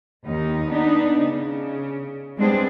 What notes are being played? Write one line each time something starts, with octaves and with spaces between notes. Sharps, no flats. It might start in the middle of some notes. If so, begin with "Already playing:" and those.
D#2 D#4
B3 D4 D#4
C#3
G3 G#3 B3 C4 D4 G#4